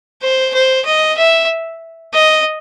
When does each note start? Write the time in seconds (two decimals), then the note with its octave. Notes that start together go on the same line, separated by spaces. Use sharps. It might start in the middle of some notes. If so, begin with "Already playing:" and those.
0.22 C5
0.54 C5
0.86 D#5
1.18 E5
2.14 D#5